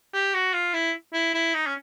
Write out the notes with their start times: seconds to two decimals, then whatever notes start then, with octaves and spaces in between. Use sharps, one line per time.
0.14 G4
0.34 F#4
0.54 F4
0.74 E4
1.13 E4
1.34 E4
1.54 D#4
1.66 C#4